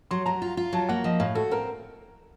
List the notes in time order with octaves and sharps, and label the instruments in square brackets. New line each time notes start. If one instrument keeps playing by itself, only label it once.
[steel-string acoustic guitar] F#3 [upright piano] C6
[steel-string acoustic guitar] F#3 [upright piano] A#5
[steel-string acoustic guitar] F4
F4
[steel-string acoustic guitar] F#3 [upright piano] A5
[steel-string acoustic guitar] A#3 [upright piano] F#5
[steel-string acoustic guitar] F3 [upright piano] D#5
[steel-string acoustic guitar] A2 [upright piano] F5
[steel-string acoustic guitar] F#4 [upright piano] A4
[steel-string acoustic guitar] C4 [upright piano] A#4